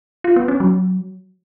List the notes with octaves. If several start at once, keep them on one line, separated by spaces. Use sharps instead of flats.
F4
B3
C#4
F#3